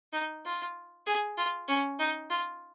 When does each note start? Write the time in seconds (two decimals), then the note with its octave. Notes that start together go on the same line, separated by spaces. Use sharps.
0.13 D#4
0.45 F4
1.06 G#4
1.37 F4
1.68 C#4
1.99 D#4
2.30 F4